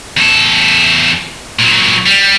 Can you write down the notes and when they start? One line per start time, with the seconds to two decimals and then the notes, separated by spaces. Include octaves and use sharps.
0.17 E2 A4
1.59 A#2 F#3
2.06 G3